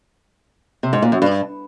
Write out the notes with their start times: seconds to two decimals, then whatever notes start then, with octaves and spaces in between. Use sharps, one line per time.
0.83 C3
0.93 G#2
1.02 A#2
1.12 F#2
1.22 G2